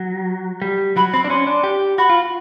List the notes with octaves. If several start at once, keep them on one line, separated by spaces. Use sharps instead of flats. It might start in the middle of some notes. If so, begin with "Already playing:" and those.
Already playing: F#3
G3
F#3 B5
C4 B5
D4
C#4 C6
D4
G4
F#4 B5
F4